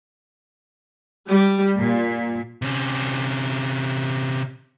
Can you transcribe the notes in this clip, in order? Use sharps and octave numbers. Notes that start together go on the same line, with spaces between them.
G3
A#2
C3 C#4